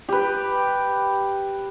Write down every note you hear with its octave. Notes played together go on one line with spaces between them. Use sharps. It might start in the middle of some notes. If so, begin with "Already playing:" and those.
G4 B4